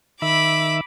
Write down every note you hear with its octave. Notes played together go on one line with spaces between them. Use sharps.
D#3 E5 B5 D6